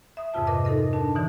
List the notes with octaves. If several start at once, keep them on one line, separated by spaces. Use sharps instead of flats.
E5 D#6
F2 G#2 C3 F4 A5
A#4 B4 D#5 D6
D#4 A4 A#4 D#5
D4 A5
B2 D3 E3